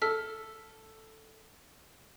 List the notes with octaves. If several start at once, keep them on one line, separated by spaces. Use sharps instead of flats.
A4 E6 F6 B6